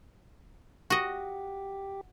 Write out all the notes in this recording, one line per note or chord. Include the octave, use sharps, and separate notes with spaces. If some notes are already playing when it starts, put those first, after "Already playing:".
F#4 G4 D#5